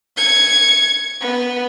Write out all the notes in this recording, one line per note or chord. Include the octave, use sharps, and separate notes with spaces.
G#6 C#7
B3